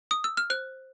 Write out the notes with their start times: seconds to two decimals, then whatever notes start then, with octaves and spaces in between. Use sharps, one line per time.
0.11 D#6
0.24 E6
0.37 F6
0.50 C5 F#6